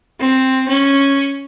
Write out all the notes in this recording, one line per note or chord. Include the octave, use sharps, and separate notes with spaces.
C4
C#4